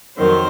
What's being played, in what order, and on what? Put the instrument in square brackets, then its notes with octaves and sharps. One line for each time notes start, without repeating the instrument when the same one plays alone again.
[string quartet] F2 D#3 F#3 C5